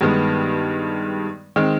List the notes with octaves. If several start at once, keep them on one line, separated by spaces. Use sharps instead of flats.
G2 D#3 G#3 B3
D#3 G#3 C4